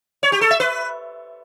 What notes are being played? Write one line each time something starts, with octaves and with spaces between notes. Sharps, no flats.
C#5
G4
A4
E5
B4